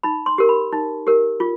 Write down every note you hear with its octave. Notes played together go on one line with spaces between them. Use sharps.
D#4 B5
C6
G4 A#4
B5
D#4
G4 A#4
F4